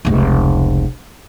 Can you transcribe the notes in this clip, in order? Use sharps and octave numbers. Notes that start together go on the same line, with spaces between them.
F1 C#2